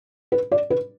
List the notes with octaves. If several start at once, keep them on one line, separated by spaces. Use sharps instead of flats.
B4
D5
B4